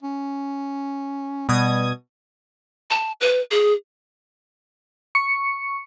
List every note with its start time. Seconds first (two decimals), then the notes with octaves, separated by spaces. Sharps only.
0.03 C#4
1.49 B2 G3 D#6 G#6
2.90 A5
3.21 B4
3.51 G#4
5.15 C#6 C#7